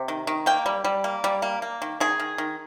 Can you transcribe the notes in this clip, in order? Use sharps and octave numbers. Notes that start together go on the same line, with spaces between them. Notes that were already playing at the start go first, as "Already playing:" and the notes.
Already playing: C3
D#3
D#3
A#3 G5
G3
G3
A#3
G3
A#3
A#3
D#3
D#3 G#4
D#3
D#3